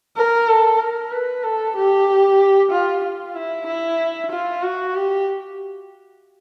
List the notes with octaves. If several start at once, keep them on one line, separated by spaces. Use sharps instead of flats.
A#4
A4
A#4
B4
A4
G4
F4
F4
E4
E4
F4
F#4
G4